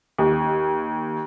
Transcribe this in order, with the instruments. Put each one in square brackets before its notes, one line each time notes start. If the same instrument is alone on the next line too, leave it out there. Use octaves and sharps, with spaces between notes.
[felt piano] D#2